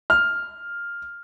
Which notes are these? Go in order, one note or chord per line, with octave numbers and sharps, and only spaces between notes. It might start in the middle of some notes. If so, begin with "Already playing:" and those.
F6